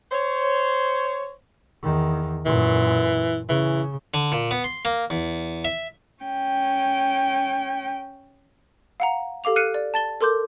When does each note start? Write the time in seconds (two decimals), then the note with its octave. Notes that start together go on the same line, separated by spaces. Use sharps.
0.12 C5 C#5
1.82 E2 D#3
2.45 F#2 A#2 E3
3.49 C#3 E3
4.14 D3
4.32 A#2
4.51 B3
4.64 C6
4.85 A#3
5.10 E2
5.65 E5
6.23 C#4 G5
9.00 F5 F#5 A#5
9.44 G4 A4 F5 D6 F7
9.56 F6 F#6 C7 C#7 D#7
9.74 D5
9.94 A5 A6 G7
10.21 A4 A#4 C6 D6 G6